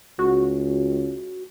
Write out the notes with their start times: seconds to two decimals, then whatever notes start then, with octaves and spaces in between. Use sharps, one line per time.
0.19 C#2 F#4